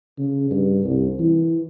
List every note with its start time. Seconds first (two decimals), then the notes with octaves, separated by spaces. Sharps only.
0.19 C#3
0.51 G2
0.84 C2
1.20 E3